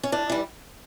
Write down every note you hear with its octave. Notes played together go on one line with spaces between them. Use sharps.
C#4
A2 D4
E3 G3